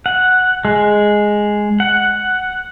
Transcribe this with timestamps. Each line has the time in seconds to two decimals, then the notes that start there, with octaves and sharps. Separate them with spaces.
0.06 F#5
0.65 G#3
1.80 F#5